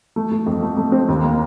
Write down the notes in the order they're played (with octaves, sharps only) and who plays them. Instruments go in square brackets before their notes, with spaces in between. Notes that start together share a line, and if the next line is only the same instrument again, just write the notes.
[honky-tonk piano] A3
A3
F2
A3
A3
C4
D#2
A#3